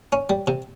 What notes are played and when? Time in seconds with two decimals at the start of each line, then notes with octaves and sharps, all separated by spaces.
0.12 C#4
0.30 G3
0.47 C3